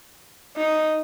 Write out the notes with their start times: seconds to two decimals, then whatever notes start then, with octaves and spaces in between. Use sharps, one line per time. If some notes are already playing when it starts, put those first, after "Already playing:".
0.57 D#4